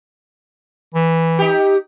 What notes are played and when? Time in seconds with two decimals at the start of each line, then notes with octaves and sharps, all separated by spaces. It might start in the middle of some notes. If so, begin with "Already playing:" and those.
0.94 E3
1.39 D#4 G4